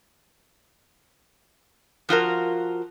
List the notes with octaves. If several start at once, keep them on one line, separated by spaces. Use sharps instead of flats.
F3 F4 F#4 A#4